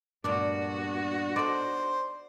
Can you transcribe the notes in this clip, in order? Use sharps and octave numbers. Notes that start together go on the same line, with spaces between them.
D2 G2 A#2 B3 D4 F#4
D#4 A4 C5 D5